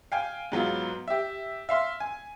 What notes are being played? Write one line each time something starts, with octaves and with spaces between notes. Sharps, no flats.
F5 G5 G#5
G#2 F#3 B3 F4
G4 E5
E5 F5 C6
G#5